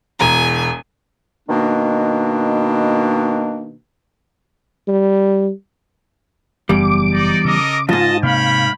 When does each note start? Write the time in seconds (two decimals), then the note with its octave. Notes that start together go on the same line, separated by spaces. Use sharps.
0.20 E1 E2 G#5 A#5
1.49 B2 D#3 A#3 D4
4.88 G3
6.69 F#1 E2 G3 D6
7.12 D#4 D5
7.45 C#3 A4 A#4 D#5
7.89 F2 G#2 F4 D#5 A5
8.23 C3 A#3 C#5 F5 G5 B5